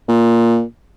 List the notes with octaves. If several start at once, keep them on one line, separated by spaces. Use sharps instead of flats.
A#2